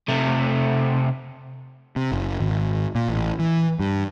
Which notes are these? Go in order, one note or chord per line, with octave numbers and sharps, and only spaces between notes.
C3 A3
C3
F#1
G#1
A#2
A1
E3
G2